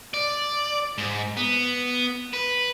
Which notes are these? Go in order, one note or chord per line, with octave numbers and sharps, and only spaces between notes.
D5
G#2
B3
B4